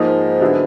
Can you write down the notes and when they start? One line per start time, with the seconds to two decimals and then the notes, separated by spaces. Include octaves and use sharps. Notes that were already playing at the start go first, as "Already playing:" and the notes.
Already playing: G#2 F3 A#3 D#4
0.41 D3 F#3 B3 E4